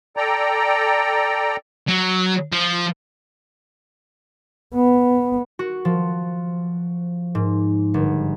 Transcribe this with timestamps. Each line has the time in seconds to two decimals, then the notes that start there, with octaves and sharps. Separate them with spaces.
0.17 A4 D5 G5 A#5
1.88 F#3
2.52 F3
4.75 B3
5.59 F#4
5.85 F3
7.35 G#2
7.94 G1